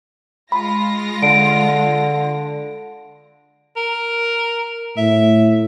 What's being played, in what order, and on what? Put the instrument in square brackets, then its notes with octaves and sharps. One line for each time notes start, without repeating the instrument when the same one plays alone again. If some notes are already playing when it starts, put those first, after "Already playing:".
[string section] G#3 F4 A#6 [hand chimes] B5
[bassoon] D3 [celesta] D7
[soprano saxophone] A#4
[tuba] A2 [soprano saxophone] E5